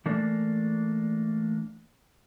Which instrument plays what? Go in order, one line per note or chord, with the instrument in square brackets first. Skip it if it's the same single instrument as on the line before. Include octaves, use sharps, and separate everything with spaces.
[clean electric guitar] E3 A3 A#3 D4